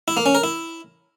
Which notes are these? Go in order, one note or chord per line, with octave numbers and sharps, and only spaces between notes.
E4
A#3
C#4
A#4
E4